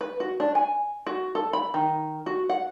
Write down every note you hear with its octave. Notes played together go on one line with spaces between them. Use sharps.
B4
F#4
D4
G#5
F#4
A4
B5
D#3
F#4
F#5